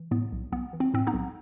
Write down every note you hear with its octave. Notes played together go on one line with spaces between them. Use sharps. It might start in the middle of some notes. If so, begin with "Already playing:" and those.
Already playing: E3
A2 B3
B1
B1 B3
E3
C4
A2 C4
B3 D#4
B1